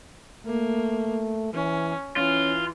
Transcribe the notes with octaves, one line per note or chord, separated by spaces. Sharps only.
A3 A#3
E3 C#4
E3 C#4 F4